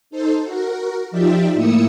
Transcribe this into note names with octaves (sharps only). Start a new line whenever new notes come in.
D#4 A4 C5
F#4 A#4
F3 D#4 F4 G4 D5 E5
A2 A#3 E4 D#6 E6 C#7